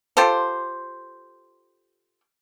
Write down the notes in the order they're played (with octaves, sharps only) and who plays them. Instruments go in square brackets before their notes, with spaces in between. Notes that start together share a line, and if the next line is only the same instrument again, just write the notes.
[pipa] F4 G4 A4 C5